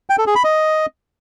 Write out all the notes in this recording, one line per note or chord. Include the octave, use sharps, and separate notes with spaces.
G5
A4
G#4
B5
D#5